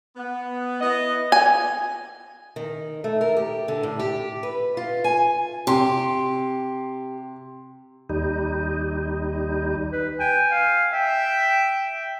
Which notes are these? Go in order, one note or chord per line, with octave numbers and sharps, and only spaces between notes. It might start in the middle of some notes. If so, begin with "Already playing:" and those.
B3
B3 E4 D#5
G#5
D#3
A3
A#4
G4
D3
A2
G4
B4
F4
G#5
C3 G4 C6
D#2 G3 D#4
B4
G5 G#5
F5
E5 G5